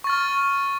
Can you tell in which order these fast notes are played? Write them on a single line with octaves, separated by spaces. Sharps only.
C#6 A6 F6